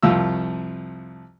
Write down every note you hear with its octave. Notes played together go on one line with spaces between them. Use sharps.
C2 F2 F3 F4 E6